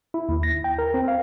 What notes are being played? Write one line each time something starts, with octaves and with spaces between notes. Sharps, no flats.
E4
D#2
A#6
G5
A#4
C4
F5